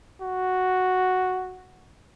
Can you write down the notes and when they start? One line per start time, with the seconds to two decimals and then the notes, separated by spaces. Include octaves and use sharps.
0.21 F#4